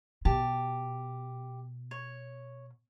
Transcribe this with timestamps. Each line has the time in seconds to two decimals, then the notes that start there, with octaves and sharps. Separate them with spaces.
0.25 B2 G4 A5
1.91 C#5